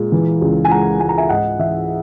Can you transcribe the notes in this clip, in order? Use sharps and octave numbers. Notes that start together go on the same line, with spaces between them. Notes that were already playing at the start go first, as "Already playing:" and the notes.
Already playing: A#2 G#3
E3
C#2
G#5
G#3 F#5 A#5
G#3 G#5
A#5
E5 G#5
G#2 D#5 F#5
E3 E5